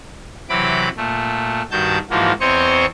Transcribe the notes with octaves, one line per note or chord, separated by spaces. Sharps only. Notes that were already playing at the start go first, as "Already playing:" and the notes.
C3 E3 F#3 B5 D6
A#2 A3
G2 D#3 F#4 A5 G6
G#2 E3 F3 A#3 F4 F#4
E2 C4 C5 C#5 D#5 C#6